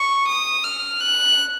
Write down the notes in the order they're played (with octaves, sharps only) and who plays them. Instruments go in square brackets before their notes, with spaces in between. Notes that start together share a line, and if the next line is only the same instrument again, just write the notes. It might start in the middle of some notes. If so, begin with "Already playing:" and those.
Already playing: [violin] C#6
D#6
F6
F#6